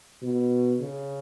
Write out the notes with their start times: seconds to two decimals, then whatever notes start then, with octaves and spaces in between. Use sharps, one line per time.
0.22 B2
0.80 C#3